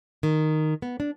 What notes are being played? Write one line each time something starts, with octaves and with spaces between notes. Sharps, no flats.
D#3
B3
D4